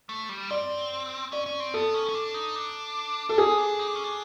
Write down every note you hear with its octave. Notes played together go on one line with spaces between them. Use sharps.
A3
G3
C4 D5
C#4 D5
C#4
C4
B3 A4
C#4
C#4
D4
D#4
D4
D4 A4
D#4 G#4
D4
D#4
D4
C#4
D4